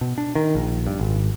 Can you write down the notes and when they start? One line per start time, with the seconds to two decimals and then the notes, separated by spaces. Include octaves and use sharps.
0.01 B2
0.18 D4
0.35 D#3
0.55 A#1
0.87 G2
0.99 G#1